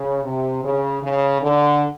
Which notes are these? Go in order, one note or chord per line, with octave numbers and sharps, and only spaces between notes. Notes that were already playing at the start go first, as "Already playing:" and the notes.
Already playing: C#3
C3
C#3
C#3
D3